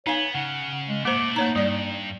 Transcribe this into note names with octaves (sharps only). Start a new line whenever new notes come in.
B3 D#4 C#5 F5 G#5
C#3 F#5
G#3
A3 A#3 E4 C5 D6
A#3 D#4 C#5 A#5
G2 G3 D5